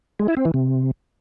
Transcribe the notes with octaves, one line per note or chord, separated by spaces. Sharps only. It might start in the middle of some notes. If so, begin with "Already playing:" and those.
G#3
E4
C4
E3
C3